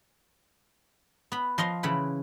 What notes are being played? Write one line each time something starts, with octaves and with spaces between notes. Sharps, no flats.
B3 B5
F3 D#5 F5 C6
C#3 E3 F#5 B5